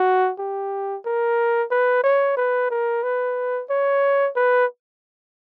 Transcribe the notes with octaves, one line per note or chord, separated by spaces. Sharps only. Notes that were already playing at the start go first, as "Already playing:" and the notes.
Already playing: F#4
G4
A#4
B4
C#5
B4
A#4
B4
C#5
B4